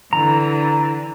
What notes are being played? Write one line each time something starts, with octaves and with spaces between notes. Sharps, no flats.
D3 E3 A#5